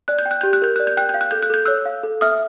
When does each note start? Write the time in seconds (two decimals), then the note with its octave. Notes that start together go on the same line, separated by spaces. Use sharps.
0.08 D5 F#6
0.19 G6
0.26 G5
0.31 F#6
0.41 G4 G6
0.53 F#6
0.62 A#4 G6
0.76 D5 F#6
0.87 G6
0.97 G5 F#6
1.09 G6
1.14 F5
1.21 F#6
1.31 A4 G6
1.42 F#6
1.50 A4 G6
1.66 C#5 E6 F#6
1.86 F5
2.04 A4
2.21 E5 D#6 F6